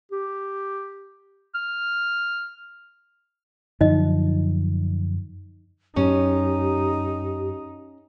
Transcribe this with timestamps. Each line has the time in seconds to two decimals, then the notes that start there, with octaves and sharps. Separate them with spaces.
0.12 G4
1.55 F6
3.81 F#2 D3 F3 D#4 D#5
5.96 F#2 C#4 D#4 G4